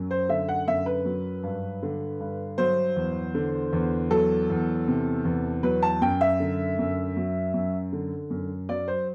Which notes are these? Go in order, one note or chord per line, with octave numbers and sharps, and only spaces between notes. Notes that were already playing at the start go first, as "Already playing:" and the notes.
Already playing: F#2 F#3
C5
D3 E5
F#5
F#2 E5
B4
F#3
G2
D3
G2
F#3 C5
E2
D3
E2
F#3 A4
E2
C3
E2
F#3 B4
A5
F#2 G5
E5
D3
F#2
F#3
F#2
D3
F#2
F#3 D5
C5